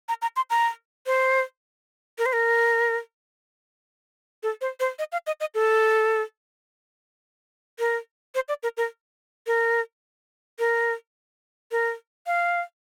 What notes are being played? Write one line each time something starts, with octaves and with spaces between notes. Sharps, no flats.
A#5
A#5
C6
A#5
C5
A#4
C5
A#4
A4
C5
C5
D#5
F5
D#5
D#5
A4
A#4
C5
D5
A#4
A#4
A#4
A#4
A#4
F5